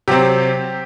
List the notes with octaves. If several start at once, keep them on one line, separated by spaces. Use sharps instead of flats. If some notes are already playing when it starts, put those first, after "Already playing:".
C3 F#3 C4 G4